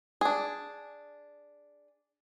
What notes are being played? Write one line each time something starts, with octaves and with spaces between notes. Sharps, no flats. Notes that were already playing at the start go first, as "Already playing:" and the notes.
D4 G#4